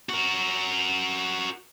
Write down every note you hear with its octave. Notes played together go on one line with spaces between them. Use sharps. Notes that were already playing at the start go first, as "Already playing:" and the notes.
F#4 A#4